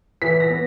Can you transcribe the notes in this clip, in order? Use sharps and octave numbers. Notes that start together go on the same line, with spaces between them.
E3 B6
A#6
B3